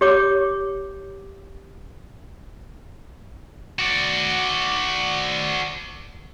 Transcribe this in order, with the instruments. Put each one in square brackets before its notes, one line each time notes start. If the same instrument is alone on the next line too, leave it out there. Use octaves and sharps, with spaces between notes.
[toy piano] G4 C#5 D6
[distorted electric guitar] F#4 D5